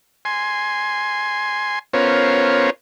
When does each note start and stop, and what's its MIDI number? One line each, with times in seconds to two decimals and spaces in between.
0.25 1.79 80
0.25 1.79 84
1.93 2.70 59
1.93 2.70 61
1.93 2.70 65
1.93 2.70 70
1.93 2.70 72
1.93 2.70 73